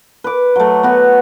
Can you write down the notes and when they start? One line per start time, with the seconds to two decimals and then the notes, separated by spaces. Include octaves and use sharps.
0.24 B4 D6
0.56 F#3 A3
0.83 B3 F#4